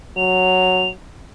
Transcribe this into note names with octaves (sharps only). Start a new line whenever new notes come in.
F#3 F7